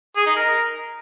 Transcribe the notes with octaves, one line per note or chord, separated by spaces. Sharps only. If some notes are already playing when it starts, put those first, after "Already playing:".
G#4
D#4
A#4